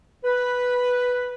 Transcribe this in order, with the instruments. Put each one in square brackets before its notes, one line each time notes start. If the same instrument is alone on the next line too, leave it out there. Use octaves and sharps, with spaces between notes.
[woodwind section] B4